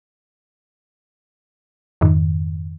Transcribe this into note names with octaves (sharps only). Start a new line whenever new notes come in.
F2 G#2 D#3